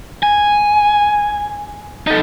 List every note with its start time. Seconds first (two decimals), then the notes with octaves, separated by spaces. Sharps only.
0.23 G#5
2.07 D#4 A4